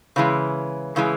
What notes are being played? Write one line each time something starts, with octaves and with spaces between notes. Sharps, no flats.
C#3 E3 G#3
C#3 E3 G#3